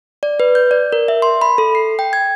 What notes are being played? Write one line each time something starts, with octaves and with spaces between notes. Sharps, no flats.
D5
B4
G6
D5
A#4
E5
C6
B5
A4
C7
G5
G#6